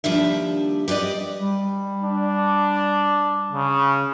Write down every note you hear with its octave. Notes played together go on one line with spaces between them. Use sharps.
D#2 F3 G3 D4 E5
G4 B4 C5 D5 D#5
G3
D4
C#3